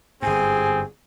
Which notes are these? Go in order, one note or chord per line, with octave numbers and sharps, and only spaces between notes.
G1 G#2 C4 G#4 G#5